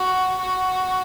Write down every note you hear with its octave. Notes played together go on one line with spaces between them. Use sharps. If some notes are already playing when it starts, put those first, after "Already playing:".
Already playing: F#4
F#4